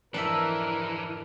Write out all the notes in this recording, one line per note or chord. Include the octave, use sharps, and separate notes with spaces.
F2 G#2 D3 E3 D4 G4 A#4 E5